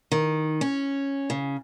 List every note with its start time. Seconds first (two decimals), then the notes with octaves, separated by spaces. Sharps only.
0.12 D#3
0.61 C#4
1.30 C#3